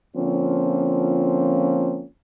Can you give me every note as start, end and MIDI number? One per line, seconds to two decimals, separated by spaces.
0.16 2.04 50
0.16 2.04 53
0.16 2.04 58
0.16 2.04 60
0.16 2.04 61
0.16 2.04 65